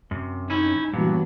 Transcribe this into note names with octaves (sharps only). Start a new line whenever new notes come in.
F#2 C3
C#4 D#4 E4
G2 A#2 E3 F#3 B3